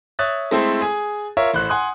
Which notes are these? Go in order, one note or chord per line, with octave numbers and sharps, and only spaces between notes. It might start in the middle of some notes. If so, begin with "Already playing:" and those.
C#5 E5 D#6 F#6 A6
G#3 A3 C4 E4 A4 C5
G#4 G#5
F4 A#4 C#5 E5
A1 A2 C5 F#6
F#5 G#5 C6 D#6 F#6